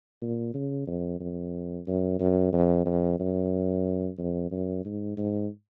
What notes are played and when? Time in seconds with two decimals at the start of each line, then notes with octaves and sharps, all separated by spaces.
0.22 A#2
0.54 C#3
0.87 F2
1.20 F2
1.87 F#2
2.20 F#2
2.53 F2
2.86 F2
3.19 F#2
4.18 F2
4.51 F#2
4.85 G#2
5.17 G#2